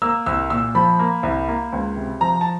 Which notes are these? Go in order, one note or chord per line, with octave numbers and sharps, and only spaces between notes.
A#3 E6
C2 E6
A#2 E6
F3 B5
A#3
C2
A#3
C#2
C3
F3 A#5
A5